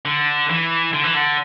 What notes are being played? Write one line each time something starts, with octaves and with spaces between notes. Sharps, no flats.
D3
E3
D3
E3
D3